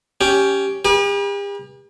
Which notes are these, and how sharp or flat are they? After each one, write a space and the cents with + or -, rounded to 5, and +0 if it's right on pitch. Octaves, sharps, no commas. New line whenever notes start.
C#4 +10 G4 +0
G4 +45 B4 -40